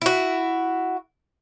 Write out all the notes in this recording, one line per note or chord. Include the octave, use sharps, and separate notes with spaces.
E4 F#4